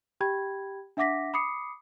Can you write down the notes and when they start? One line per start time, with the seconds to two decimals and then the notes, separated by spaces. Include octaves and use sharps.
0.21 G4 G5 B5 G#6
0.97 D4 E5 F#5 D6 A#6 B6
1.34 B5 D6 D#6 C7 C#7